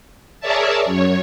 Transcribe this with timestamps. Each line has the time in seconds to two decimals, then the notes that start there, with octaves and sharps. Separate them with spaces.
0.40 G#4 A#4 C#5 D5 E5 A5
0.85 F#2 C#5